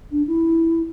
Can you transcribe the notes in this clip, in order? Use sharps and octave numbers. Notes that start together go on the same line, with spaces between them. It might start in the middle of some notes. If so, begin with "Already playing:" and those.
D4
E4